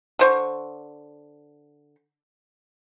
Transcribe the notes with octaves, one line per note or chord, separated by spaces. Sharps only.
D3 C5 C#6